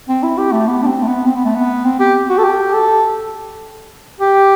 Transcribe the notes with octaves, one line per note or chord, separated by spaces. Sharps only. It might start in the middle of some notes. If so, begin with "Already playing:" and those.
C4
E4
G4
A3
B3
D4
C4
A3
B3
C4
B3
A3
B3
C4
G4
F#4
A4
G4
A4
G4